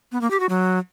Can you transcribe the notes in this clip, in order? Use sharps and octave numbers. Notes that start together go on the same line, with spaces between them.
B3
A#3
G4
F#4
F#3